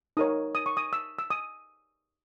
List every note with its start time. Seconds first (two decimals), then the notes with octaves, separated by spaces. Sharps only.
0.17 D#4 A#4 C#5 D#6
0.55 D#6
0.66 C#6
0.77 D#6
0.93 E6
1.19 E6
1.30 D#6